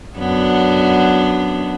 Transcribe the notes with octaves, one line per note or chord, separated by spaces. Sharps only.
F#2 B3 D4